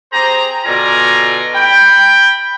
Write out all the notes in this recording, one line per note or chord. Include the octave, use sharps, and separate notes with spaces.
C4 G4 G#4 C5 A#5
B2 D3 F4 D5 G#5 A#5
G5 B5